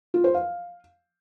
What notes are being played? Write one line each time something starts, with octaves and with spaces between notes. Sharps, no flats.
F4
C5
F5